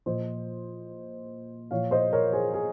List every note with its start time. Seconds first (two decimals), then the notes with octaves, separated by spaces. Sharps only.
0.06 A#2 F3 C5 D#5
1.71 A#2 F3 C#5 F5
1.91 C5 D#5
2.12 A#4 C#5
2.33 G#4 C5
2.53 G#4